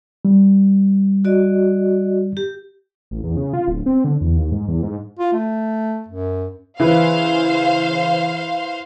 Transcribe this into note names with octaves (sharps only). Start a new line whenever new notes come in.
G3
F#4 D5 D#5
G4
A1
E2
C#3
F4
D1
C4
D3
E2
D#2
G#2
E2
G#2
F4
A3
F#2
C#3 E3 E4 B4 C5 F5